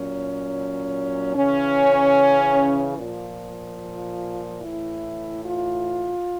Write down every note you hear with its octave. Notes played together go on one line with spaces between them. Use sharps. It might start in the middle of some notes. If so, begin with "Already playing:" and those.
Already playing: A#2 F#3 C#4
C#3 E3 C#4
A#2 F3
A2 E3 E4
F4